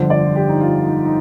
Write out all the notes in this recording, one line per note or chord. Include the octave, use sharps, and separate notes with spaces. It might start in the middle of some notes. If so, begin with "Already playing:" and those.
Already playing: G1 F2 D3 C5
D5
G4
D#4
F4
D#4
D#4